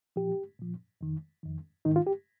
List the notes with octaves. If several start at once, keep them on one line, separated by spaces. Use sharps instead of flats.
A#2 F3 G4
A#2 F3
F2 D#3
F2 D#3
G#2 D#3 D#4
F4
G4